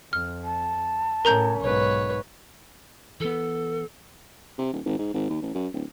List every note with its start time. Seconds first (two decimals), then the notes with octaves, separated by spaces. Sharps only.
0.13 F2 F6
0.44 A5
1.25 A2 C#4 A#4 A#5 G6
1.61 B1 G#2 B4 C#5
3.20 E3 B3 A4
4.58 C3
4.73 D#1
4.86 G#1
4.98 G#2
5.14 G#1
5.29 D#2
5.42 A1
5.54 F#2
5.73 D1